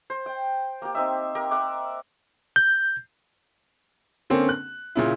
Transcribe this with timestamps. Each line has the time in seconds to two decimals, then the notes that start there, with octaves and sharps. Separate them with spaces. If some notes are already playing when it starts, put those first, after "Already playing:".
0.10 C5
0.26 G5
0.82 A#3 G4
0.95 C4 D#4 E5
1.35 G4 A#4
1.51 E5 F#5 D6
2.56 G6
4.30 D3 A#3 C4 C#4
4.49 F#6
4.95 A#2 C#3 E4